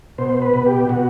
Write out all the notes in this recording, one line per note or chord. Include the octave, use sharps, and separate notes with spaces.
B2 C5
B4
B2
G4
B2 F#4